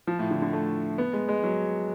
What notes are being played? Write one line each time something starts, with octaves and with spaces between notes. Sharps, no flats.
F3
A2
D3
D3
A3
B3
G#3
G#3
F#3